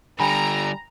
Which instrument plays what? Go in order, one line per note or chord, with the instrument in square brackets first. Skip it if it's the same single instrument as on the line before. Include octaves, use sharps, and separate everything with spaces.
[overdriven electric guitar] D3 G3 [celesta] G5 G#5 B5 [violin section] A#5